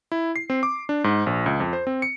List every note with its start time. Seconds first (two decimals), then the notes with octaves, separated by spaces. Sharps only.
0.12 E4
0.36 C7
0.50 C4
0.63 D6
0.89 D4
1.04 G#2
1.26 A#1
1.46 C#2
1.60 F2
1.73 C5
1.87 C4
2.02 C#7